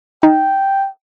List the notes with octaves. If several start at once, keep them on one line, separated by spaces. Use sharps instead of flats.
D#4 G5